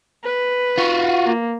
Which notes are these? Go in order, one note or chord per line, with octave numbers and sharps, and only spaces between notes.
B4
F4 F#4
A#3